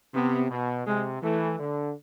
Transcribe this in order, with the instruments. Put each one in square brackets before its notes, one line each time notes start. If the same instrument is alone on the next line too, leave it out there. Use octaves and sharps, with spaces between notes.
[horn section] C3 [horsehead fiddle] B3
[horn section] B2
[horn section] C3 [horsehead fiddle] G#3
[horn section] E3 [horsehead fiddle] A3
[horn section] D3